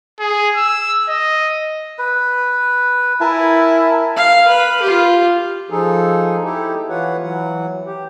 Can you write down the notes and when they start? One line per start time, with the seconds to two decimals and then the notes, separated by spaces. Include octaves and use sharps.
0.19 G#4
0.56 E6
1.08 D#5
1.99 B4
3.21 E4 A#4 G#5 A5
4.17 F5
4.48 B4
4.83 F4 G4
5.70 F3 D#4 G#4 A4
6.43 D#4 E4 G4 A4
6.89 E3 F4 B4 C#5 F#5
7.22 E3 F#3 F#5
7.86 G4